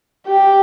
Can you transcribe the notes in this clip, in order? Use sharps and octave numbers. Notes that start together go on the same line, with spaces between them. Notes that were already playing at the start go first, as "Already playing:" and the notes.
G4